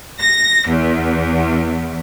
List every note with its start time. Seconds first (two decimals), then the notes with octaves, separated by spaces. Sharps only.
0.20 A#6
0.70 E2